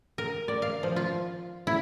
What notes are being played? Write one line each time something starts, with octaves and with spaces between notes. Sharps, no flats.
A#4
D5
F5
F3
F4
E4